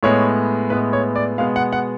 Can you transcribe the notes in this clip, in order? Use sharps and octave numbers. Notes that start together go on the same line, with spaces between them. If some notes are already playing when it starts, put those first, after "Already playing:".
A2 G#3 B3 C#5
A2 G#3 B3 B4
C#5
D5
B2 G#3 B3 F5
F#5
F#5